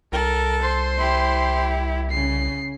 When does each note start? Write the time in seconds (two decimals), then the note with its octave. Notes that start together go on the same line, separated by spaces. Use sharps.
0.12 C2 A4 A#4
0.62 C5 C6
0.97 E4 G4
2.11 C#3 C7